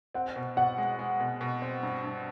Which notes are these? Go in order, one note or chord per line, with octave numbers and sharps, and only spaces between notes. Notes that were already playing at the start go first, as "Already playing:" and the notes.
C4 F#5
B2
B2 F#5
G#3
G#3
B2
B2
C4
G2
G2